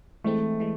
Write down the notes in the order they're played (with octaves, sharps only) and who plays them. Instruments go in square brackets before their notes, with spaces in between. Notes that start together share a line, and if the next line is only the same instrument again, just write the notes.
[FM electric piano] E3 G#3 C4 E4 [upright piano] A3
[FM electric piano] E3 G#3